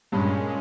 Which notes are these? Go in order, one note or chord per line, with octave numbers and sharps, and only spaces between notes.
G2 A#2 G#3 C#4